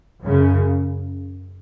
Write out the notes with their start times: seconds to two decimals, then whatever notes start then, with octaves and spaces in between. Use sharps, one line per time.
0.22 F#2 C#3